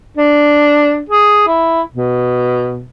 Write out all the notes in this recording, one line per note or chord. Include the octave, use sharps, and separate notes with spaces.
D4
G#4
E4
B2